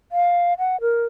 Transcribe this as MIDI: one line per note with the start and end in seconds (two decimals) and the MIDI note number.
0.12 0.54 77
0.59 0.80 78
0.81 1.06 70